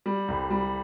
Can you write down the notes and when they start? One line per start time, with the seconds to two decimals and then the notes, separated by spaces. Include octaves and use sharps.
0.06 G3
0.28 C2
0.50 G3